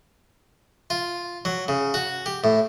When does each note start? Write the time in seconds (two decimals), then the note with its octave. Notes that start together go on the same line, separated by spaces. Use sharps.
0.90 F4
1.45 F#3
1.68 C#3
1.94 F#4
2.26 G4
2.44 A2